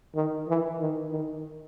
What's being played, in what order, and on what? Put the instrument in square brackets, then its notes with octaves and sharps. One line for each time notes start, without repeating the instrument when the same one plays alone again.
[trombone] D#3
E3
D#3
D#3